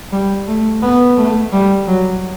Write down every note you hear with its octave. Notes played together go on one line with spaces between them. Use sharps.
G3
A3
B3
A3
G3
F#3